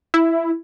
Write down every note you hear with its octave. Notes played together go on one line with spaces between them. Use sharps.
E4